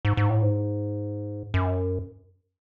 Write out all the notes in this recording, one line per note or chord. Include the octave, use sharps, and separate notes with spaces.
G#2
G#2
A2
G#2
F#2